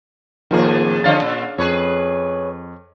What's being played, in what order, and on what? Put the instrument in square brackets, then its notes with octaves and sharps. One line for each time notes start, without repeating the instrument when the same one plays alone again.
[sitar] F2 A2 G#4 [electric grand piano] D#3 F3 A#3
[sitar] D3 F3 C#4 [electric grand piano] D5 F5 A6
[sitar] A#2
[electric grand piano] F2 [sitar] G#4 B4 C#5